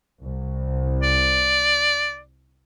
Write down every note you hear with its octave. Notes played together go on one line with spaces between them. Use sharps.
C2
D5